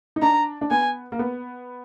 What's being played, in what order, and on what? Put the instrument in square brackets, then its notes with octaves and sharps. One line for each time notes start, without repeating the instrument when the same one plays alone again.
[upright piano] D#4
[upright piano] D4 [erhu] A#5
[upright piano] D4
[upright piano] B3 [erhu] G#5
[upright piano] A#3
B3